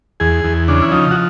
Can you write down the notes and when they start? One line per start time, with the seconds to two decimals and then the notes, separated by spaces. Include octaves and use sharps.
0.20 E2 G#4
0.44 E2
0.68 C#3 D4
0.82 E4
0.92 F3 D#4
1.11 F#4